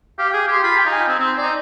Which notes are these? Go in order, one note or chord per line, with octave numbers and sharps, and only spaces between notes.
G4 F5
G#4 G5
G4 C6
F4 B5
G5
D#4
G#5
C4
C4
C5
D#4 D5